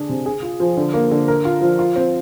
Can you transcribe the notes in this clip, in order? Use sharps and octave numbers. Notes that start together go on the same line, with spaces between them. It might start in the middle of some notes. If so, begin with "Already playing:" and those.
Already playing: D3 D4 G#4
C3
G#4
F4
F3
D3
A#3
D3
A#4
F4
F3
F4
C4